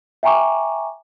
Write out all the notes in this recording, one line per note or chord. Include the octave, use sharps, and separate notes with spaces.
E5 G5 G#5 A#5 C#6 D6